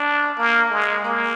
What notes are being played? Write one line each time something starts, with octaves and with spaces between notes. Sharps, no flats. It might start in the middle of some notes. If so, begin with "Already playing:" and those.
Already playing: D4
A#3
G#3
A#3